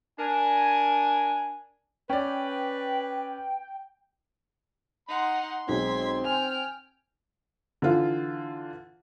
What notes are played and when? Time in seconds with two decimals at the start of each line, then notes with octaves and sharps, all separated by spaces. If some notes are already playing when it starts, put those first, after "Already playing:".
0.18 D4 A#4 G#5
2.10 C#4 B4 D5 G5
5.09 D#4 F#5 C6
5.69 B1 G#3 C4 G#6 B6
6.24 G5 G#5 F6
7.82 D3 E3 F4